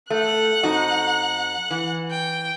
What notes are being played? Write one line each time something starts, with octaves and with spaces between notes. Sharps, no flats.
A3 F#5 F#6
F2 D#4 F#4
E3
G5